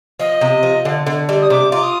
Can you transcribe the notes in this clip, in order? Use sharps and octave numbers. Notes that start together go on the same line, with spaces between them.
F3 D#5
C3
F3
D3
D3
G3
D#6
C3 D6
F4 D6
D#6